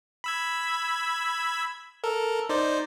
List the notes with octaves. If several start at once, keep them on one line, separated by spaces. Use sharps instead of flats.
B5 E6 G#6
A4 A#4
D#4 C5 D5